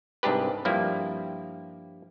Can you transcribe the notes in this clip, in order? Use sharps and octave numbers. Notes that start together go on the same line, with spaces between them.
C2 G#2 D4 G4 B4
G2 F3 G3 A#3 E4